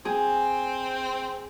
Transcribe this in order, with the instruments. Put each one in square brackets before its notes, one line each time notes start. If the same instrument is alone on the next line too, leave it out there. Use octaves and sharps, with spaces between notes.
[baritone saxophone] C4 [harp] G#4